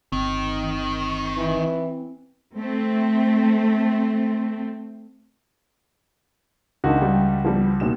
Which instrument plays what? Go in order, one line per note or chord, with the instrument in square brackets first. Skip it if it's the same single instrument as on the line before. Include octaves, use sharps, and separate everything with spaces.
[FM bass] G1 [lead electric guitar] D#3 [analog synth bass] C4
[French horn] E3
[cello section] A3 C4
[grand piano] C#2 F#4 [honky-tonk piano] D#3 D4
[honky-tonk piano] G3 G5
F3 G3 B3
D#2 B2 E7